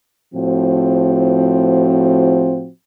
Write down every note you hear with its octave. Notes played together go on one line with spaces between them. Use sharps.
A2 F3 C4 F#4